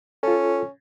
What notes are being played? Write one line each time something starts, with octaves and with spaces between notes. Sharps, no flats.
C#4 F4 A4